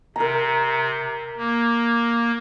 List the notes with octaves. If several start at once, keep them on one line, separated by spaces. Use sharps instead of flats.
C3 A#4 A#5
A#3